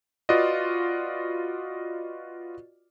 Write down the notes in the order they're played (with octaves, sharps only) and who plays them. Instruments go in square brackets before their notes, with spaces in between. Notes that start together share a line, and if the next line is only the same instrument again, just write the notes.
[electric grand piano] F4 F#4 B4 D5 D#5